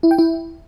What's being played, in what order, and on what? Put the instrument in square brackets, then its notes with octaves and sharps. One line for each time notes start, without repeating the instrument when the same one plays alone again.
[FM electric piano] E4
G5
E4